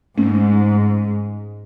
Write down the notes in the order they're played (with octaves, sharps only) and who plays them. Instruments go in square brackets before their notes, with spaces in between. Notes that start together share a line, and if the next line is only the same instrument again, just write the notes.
[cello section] G#2 [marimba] A3 C#4